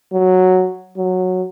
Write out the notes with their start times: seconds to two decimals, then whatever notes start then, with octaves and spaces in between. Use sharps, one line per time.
0.13 F#3
0.98 F#3